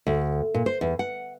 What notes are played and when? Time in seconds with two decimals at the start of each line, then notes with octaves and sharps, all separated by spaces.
0.07 D2
0.54 A#2
0.66 C5
0.81 E2
0.99 F#5